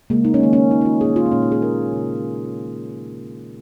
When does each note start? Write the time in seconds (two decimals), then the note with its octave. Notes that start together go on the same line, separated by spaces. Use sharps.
0.10 C#3 G#3 A#3
0.25 D#4
0.34 C#4
0.40 D#3 G#3 A#3
0.53 C#4
0.70 C#3 G#3 D#4
0.81 D#4
0.85 F4
1.01 A#2 F3 A#3 G#4
1.16 F4
1.26 A#3
1.31 A#2 G#3 C#4
1.42 D#4
1.52 G#4
1.62 D#3 A#3 A#4
1.93 C#3 A#3